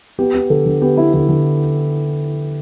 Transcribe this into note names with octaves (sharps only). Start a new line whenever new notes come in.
B3 G4
B3
D3 A4
D3
B3 G4
B3 E4
D3 E4
D3